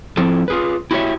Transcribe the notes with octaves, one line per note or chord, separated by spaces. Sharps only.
F3 C4 E4 A4
F4 G#4 B4
E4 F#4 G4 A4 C#5 E5